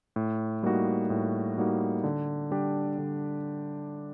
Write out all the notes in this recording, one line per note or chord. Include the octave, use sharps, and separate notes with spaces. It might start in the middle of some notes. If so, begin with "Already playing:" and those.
A2
G3 A#3 D#4 F#4
A2
G3 A#3 D#4 F#4
D3
G3 D4 G4
D3